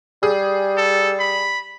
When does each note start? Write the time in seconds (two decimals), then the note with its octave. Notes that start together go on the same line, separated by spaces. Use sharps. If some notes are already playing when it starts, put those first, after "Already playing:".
0.23 G3 G#4
0.77 A4
1.20 B5